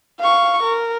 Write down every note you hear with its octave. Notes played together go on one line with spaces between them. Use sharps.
F5 C#6
A#4